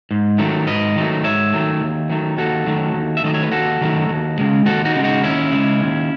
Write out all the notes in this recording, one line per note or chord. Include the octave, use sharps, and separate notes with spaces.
G#2
D#3 F#3 A3
G#2 B4 D#5
D#3 F#3 A3
G#2 C#5 E5
D#3 F#3 A3
D#2
D#3 F#3 A3
D#2 F#4 A4
D#3 F#3 A3
D#2
E5
D#3 F#3 A3 D#5
C#5
B4
D#2 F#4 A4
D#3 F#3 A3
D#2
C#3 G#3
D#2 F#4 A4
D#4 F#4
C#3 G#3
D#4 F#4
D#2 C#4 E4
C#3 G#3
D#2